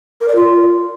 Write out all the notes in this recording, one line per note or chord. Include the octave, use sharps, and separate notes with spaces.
A#4
D5
F4